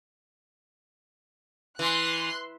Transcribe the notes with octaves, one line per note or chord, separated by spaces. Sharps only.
E3 C6 F#6